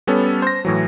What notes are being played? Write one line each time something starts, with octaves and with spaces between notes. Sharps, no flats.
G3 B3 C#4 A4
C5 A#6
A2 E3 F#3